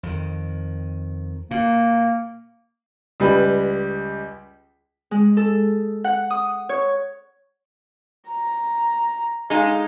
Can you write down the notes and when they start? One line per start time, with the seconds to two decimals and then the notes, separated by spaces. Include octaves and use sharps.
0.03 F2 D#3
1.51 A#2 A#3
3.20 C#2 G3 B4
5.11 G#3
5.37 A4
6.04 F#5
6.30 D#6
6.69 C#5
8.30 A#5
9.50 G#3 D#4 F5